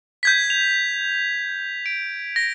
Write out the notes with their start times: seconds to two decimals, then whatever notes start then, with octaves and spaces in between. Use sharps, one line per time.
0.23 G6 G#6 B6
0.50 F7
1.86 D7
2.36 A#6